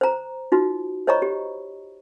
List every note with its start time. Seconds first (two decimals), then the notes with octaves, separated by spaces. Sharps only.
0.01 C5 A#5
0.52 D#4 F4 F#4
1.07 C5 C#5 D#5 A#5 B5 C#6
1.22 G4